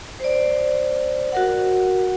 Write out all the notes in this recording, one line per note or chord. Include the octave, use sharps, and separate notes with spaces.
C5 D5
F#4 A#4 F#5